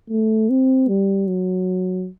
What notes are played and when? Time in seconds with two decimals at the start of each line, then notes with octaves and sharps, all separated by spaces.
0.10 A3
0.50 C4
0.88 G3
1.27 F#3